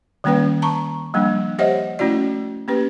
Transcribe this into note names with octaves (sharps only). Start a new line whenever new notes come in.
D#3 G3 A#3 C#4 B4 G5
A5 A#5 C#6
F3 G3 A#3 D4
G4 C5 C#5 D#5 E5 F#5
A3 C#4 E4 F#4 D5
A#3 C#4 G4 B4